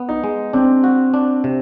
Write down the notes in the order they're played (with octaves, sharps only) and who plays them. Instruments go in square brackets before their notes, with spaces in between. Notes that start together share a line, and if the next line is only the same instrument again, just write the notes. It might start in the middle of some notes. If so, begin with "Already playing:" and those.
Already playing: [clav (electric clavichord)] B3
[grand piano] D#4
[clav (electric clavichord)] G#3
[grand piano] C4 [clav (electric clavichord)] D4
[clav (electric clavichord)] F#4
D4
C3